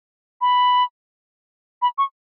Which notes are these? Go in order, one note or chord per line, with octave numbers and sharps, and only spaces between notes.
B5
B5
C#6